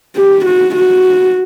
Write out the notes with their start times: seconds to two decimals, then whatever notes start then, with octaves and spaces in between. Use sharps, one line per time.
0.16 G4
0.45 F#4
0.75 F#4